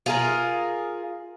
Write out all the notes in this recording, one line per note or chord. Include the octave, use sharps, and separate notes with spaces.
F4 G#4 A#4